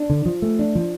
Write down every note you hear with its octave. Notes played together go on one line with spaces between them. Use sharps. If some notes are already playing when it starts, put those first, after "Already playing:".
Already playing: D4
D3
F3
A3
D4
F3